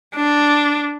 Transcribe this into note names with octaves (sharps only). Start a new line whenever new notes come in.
D4